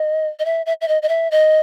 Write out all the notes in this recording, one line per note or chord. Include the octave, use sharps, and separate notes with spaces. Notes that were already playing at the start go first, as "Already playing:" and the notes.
Already playing: D#5
D#5
E5
E5
E5
D#5
D#5
E5
D#5